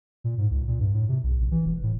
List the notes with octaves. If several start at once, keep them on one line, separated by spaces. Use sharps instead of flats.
A#2
G#2
C#2
A#2
G2
A2
C3
B1
A#1
E3
E1
A2